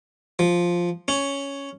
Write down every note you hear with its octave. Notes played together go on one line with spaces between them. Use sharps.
F3
C#4